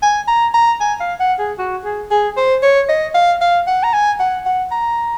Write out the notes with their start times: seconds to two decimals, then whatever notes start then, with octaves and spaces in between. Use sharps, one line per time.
0.02 G#5
0.28 A#5
0.54 A#5
0.80 G#5
1.00 F5
1.20 F#5
1.39 G#4
1.59 F#4
1.85 G#4
2.11 G#4
2.37 C5
2.63 C#5
2.89 D#5
3.14 F5
3.41 F5
3.67 F#5
3.84 A#5
3.93 G#5
4.20 F#5
4.46 F#5
4.72 A#5